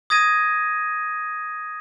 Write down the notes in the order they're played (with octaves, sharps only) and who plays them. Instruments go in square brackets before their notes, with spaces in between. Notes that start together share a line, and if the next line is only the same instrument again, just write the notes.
[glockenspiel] D#6 G#6 A#6 D#7